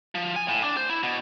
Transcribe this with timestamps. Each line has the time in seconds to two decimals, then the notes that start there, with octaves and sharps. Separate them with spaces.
0.15 F3
0.36 G#5
0.48 A2
0.63 D4
0.77 C5
0.90 E4
1.03 B2